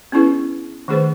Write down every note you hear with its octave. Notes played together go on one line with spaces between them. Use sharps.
B3 C#4 D4 E4 G#4 B4
D#3 A3 D4 G#4 B4 C5